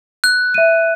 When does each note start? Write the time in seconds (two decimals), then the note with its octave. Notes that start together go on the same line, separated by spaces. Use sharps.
0.24 F#6
0.54 E5 D#7